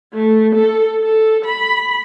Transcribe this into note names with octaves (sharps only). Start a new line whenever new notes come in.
A3
A4
A4
B5